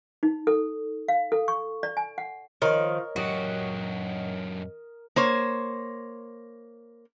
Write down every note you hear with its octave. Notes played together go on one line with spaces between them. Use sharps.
D#4
A4
F5
A4
C#6
D5
G#5
F#5
D#3 F3 A#4 C#5 D#5
F#2 F#4 G4 D#6
A#3 C5 C#5